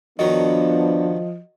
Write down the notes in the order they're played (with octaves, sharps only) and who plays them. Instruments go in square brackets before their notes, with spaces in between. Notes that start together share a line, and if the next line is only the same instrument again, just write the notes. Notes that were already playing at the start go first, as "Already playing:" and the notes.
[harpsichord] F#2 D#3 F#3 [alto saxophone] F3 [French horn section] B3 D4 [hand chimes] D#5